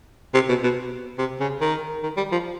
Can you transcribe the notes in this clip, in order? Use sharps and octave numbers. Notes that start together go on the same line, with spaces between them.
C3
B2
B2
C3
C#3
D#3
D#3
G3
F3